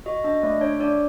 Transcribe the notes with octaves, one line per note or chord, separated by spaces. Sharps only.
F#4 D#5
D4 D#5
A3 D5
D4 C#5
D4 D5